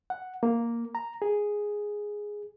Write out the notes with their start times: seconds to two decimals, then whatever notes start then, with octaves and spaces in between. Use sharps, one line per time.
0.10 F#5
0.43 A#3
0.95 A#5
1.22 G#4